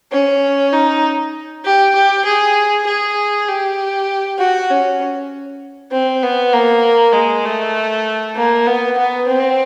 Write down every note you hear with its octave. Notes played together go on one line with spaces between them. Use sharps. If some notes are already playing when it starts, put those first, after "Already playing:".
C#4
D#4
G4
G4
G#4
G#4
G4
F#4
C#4
C4
B3
A#3
G#3
A3
A#3
B3
B3
C4